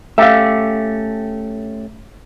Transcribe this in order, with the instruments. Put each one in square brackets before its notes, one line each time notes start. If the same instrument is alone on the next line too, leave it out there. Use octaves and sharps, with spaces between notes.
[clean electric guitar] A3 C#4 G4 [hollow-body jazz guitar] E5 F5